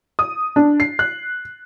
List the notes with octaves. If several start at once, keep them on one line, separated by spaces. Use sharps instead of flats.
D#6
D4
C7
F#6